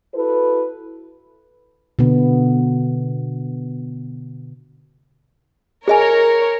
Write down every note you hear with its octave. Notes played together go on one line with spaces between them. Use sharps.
E4 F#4 A4 B4
B2 D3 B3
G#4 A#4 C#5 D#5 G#5